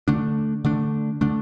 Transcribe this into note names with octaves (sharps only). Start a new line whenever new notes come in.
D3 A3 D4
D3 A3 D4
D3 A3 D4